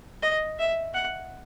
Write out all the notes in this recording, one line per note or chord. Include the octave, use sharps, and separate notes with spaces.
D#5
E5
F#5